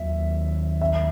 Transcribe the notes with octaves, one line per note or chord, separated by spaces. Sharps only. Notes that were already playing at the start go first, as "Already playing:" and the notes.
Already playing: D#2 D#3 F#3 E5
E5